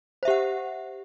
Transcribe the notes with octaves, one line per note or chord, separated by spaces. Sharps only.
G4 C5 E5 F#5